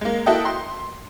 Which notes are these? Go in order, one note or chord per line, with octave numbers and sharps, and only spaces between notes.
G#3 A#3
A#3 E4 F#4 A4 D#5 G5
C6